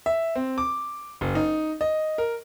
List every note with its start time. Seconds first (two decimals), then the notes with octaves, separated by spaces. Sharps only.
0.06 E5
0.35 C4
0.58 D6
1.21 F#1
1.35 D#4
1.81 D#5
2.18 A#4